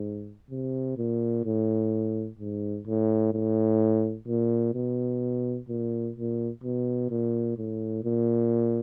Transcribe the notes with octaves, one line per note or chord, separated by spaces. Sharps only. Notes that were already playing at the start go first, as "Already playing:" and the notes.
Already playing: G#2
C3
A#2
A2
G#2
A2
A2
A#2
B2
A#2
A#2
B2
A#2
A2
A#2